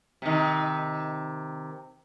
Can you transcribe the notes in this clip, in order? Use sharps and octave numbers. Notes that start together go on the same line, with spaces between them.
C3 D#3